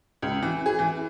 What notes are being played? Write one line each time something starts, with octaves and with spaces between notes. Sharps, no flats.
C#2
E3
G#4
E3